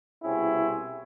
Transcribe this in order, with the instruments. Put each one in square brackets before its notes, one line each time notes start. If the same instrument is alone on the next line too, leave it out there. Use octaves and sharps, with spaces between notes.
[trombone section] C2 B2 C4 C#4 E4 G#4